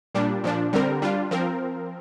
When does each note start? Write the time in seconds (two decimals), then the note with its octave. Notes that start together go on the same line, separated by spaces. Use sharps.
0.15 A#2 G3 D4
0.44 A#2 F3 D4
0.73 D3 G3 C4 A#4
1.02 G3 D4 F4
1.31 F3 C4 A#4